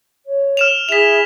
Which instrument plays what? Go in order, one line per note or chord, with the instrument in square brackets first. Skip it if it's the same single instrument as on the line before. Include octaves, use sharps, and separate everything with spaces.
[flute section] C#5
[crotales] F6 E7 F7
[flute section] E4 G#4 E5 [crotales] B6 F7